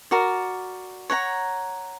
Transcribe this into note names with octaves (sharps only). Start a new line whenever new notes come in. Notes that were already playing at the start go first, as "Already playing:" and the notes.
F#4 A#4 D5
C#5 F#5 A#5